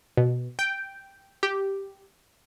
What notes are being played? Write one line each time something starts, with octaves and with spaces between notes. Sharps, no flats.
B2
G5
G4